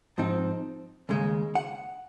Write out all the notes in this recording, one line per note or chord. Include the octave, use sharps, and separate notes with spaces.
G#2 F3 C4 D#4
D#2 C#3 G#3
F#5